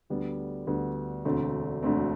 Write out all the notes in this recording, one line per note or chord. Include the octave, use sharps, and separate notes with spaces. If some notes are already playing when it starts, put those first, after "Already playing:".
D2 D3 G3 B3
D2 D3 G3 B3
E1 D2 D3 A3 C4
E1 D2 D3 A3 C4